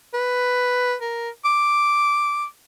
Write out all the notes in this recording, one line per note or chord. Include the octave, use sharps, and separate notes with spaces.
B4
A#4
D6